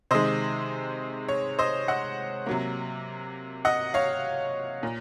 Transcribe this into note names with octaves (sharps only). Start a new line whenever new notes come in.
C3 D#3 G#3 C5 D#5
C#5
C5 D#5
D#5 F#5
C3 F#3 A#3
D#5 F#5
C#5 F5
A#2